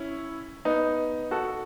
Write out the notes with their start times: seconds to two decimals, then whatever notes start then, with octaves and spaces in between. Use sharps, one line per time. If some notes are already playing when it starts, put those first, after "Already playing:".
Already playing: C#4 E4
0.65 B3 D#4
1.31 F#4 A4